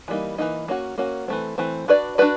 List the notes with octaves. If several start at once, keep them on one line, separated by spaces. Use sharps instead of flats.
E3 G3 A#3 D#4
E3 G3 A#3 D#4
A#3 C#4 F#4
A#3 C#4 F#4
E3 A3 C4
E3 A3 C4
D4 F#4 B4 D5
D4 F#4 B4 D5